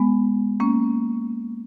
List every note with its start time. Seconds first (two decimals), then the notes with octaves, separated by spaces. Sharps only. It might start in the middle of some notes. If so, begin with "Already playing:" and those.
Already playing: G#3 B3
0.60 A#3 C#4